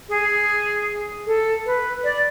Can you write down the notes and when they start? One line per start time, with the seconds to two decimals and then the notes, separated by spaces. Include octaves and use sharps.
0.09 G#4
1.27 A4
1.66 B4
2.04 D5